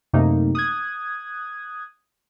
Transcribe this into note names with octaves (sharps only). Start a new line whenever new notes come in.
F#2 C3 A3 A#3 D#4
D#6 F#6 G#6